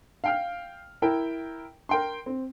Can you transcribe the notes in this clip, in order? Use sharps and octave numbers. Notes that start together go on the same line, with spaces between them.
F5 G5 F6
E4 A#4 G5
A#4 G5 C6
C4